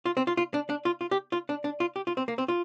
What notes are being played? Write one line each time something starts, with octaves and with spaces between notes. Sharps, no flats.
F4
C4
F4
F4
D4
D4
F4
F4
G4
F4
D4
D4
F4
G4
F4
C4
A#3
C4
F4